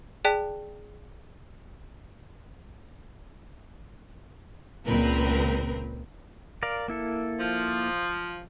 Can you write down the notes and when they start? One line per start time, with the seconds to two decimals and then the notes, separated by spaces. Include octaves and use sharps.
0.25 G#4 D5 G5 A5 F#6 B6
4.88 C#2 A#2 C4 A#4 B4
6.63 A#4 D5 F5
6.88 A#3 E4 A4
7.40 F3